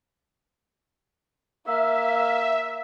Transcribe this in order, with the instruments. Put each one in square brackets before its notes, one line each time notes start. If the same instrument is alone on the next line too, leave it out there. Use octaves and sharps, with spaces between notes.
[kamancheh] A#3 F5 [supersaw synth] E5